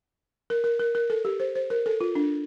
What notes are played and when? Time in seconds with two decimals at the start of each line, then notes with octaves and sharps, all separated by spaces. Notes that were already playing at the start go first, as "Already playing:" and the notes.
0.50 A#4
0.64 A#4
0.80 A#4
0.95 A#4
1.10 A4
1.25 G4
1.40 C5
1.55 C5
1.70 A#4
1.86 A4
2.01 F4
2.15 D4